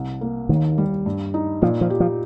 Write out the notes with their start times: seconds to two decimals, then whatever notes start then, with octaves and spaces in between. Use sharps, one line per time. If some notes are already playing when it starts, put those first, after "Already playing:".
Already playing: C2
0.21 A#3
0.49 D#2 D#3
0.78 G3
1.06 G2
1.34 D#4
1.62 A#2 F3
1.81 F3
1.90 G4
2.00 F3